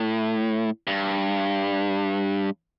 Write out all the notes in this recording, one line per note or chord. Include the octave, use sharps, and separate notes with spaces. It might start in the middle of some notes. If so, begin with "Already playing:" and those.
Already playing: A2
G2